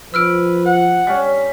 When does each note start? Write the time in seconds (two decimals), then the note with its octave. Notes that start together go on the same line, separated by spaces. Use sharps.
0.14 F3 B4 E6 F6 D7
0.66 F#5
1.07 G3 C#4